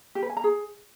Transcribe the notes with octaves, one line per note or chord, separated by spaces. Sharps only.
G4
B4
G#5
A#5
G#4